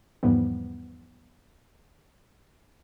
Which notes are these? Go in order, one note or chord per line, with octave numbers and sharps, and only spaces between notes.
E2 G#2 E3 F3 G3 B3